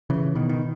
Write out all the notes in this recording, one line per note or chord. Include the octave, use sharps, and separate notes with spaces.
C#3 E3
B2 D#3
D#3